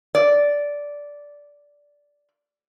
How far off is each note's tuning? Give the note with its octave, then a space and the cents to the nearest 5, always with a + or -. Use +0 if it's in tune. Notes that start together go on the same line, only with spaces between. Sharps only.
D5 -10